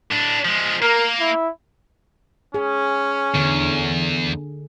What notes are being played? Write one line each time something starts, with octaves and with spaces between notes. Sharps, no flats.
A2 D4
F3 G#3
A#3 A#4
E4
C#4 G#4
E2 D3